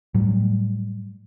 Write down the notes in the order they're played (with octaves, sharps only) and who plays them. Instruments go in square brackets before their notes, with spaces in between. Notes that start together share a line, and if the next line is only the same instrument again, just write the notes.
[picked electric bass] A2 F#3 G3